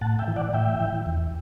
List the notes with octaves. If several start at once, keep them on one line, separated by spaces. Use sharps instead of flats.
A2 F#5 A5
E5 G5
E3
D5 F#5
A2 E5 G5
E3
E2